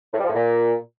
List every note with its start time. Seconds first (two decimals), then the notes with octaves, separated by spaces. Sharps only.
0.14 A2
0.19 G3
0.24 F3
0.29 A2
0.34 A#2